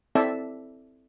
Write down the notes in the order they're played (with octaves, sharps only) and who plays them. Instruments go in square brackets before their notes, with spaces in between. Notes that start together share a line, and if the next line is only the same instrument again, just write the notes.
[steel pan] C4 E4 A4 D5 E5 A5